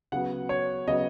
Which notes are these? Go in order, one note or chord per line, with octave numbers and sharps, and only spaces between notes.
C#3 F#3 B3 F#5
C#5
C#3 F#3 B3 D#5